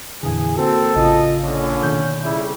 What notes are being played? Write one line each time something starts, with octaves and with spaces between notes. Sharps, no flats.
F2 A#2 D3 E3 G#4
A#3 C4 F#4 A4
A1 C#3 F4 D#5
A#2 D3 C#4
B2 D#3 G6
F2 C#3 G3 E4